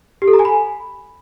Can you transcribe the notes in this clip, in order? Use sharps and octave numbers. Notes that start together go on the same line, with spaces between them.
G4
A4
A#5
G#5
B5